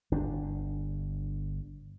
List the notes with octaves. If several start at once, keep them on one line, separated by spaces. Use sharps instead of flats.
G1 D4